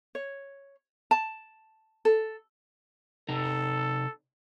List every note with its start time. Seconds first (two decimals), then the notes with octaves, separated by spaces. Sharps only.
0.15 C#5
1.11 A5
2.05 A4
3.29 C3 D#4 A4